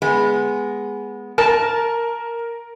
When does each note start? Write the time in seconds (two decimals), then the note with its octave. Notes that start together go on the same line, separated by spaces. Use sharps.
0.02 G#3 B3
1.38 A#4 A5